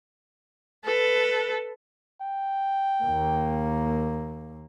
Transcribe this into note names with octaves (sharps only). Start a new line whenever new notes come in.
A4 B4
G5
D#2 A#3